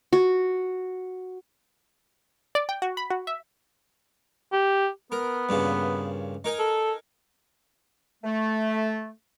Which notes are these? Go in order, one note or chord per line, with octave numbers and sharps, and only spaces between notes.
F#4
D5
G5
F#4
B5
F#4
E5
G4
B3 A#4
G2 A#2 C#3
D#4 A#4 G#5
A4
A3